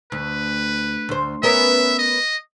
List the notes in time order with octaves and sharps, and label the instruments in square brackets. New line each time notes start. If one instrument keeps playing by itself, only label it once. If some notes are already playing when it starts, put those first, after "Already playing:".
[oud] D2 [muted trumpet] B4
[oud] D2 C5
[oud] B3 C#4 A#4 [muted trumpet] E5
[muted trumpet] D#5